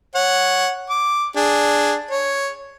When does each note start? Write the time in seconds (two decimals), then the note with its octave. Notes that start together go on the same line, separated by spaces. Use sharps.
0.15 C#5 F#5
0.90 D6
1.36 D4 G#4
2.11 C#5